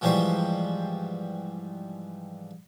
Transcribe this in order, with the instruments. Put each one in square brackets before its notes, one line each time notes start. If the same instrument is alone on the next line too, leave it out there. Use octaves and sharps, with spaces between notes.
[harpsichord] G#2 E3 F3 G3 C5 C#6